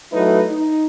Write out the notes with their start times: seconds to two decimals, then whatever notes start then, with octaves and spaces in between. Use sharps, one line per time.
0.12 F#3 A3 D#4 E4 B4
0.51 D#4